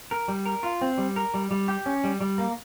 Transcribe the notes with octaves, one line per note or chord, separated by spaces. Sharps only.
A#4
G3
A#4
F4
C4
G3
A#4
G3
G3
G4
C#4
G3
G3
A#3